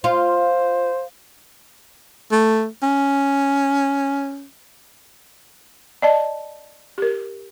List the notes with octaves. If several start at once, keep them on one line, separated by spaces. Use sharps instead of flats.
F4 C5
A3
C#4
D5 D#5 A5
G4 A#4